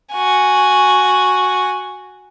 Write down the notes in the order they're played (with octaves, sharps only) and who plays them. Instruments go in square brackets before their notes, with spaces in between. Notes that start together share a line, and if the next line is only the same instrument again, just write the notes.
[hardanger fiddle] F#4 G#5